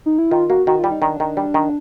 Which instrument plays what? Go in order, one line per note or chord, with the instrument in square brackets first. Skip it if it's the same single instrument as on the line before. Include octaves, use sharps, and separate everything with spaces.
[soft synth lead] D#4
E4
[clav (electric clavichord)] D#3 [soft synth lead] F4
[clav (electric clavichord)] A#3 [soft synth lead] F#4
[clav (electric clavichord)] D#3 [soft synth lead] F#4
[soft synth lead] F4
[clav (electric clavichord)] G3
[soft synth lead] D#4
[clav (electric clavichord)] D#3 [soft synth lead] D4
[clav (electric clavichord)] D#3
G3
D#3